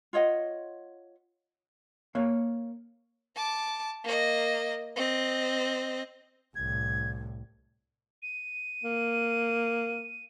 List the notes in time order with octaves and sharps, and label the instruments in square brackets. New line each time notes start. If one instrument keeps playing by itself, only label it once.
[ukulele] F4 C#5 D#5 F#5
[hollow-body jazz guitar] A#3 C#5 F5
[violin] A5 D6
A#3 D#5
C4 D#5
[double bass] C2 A2 [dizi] G#6
[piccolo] D#7
[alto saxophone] A#3